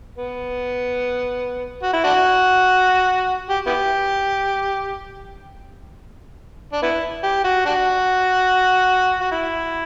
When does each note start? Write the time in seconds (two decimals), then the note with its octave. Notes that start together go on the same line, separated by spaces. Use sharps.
0.17 B3
1.83 F#4
1.93 E4
2.04 D4 F#4
3.49 G4
3.66 B3 E4 G4
6.72 D4
6.82 B3 E4
7.23 G4
7.44 F#4
7.66 D4 F#4
9.20 F#4
9.31 E4